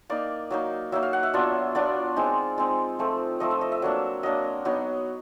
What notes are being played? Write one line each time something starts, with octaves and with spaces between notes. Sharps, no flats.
A#3 D#4 D5
F#3 A#3 D#4
F#3 A#3 D#4 E5
F5
F#5
E5
F#3 B3 D4 F4
F#3 B3 D4 F4 D5
G#3 C4 D#4
G#3 C4 D#4
F3 A3 C4
F3 A3 C4 D#5
E5
D#5
E5
F#3 A#3 D4
F#3 A#3 D4 D#5
F#3 B3 D#4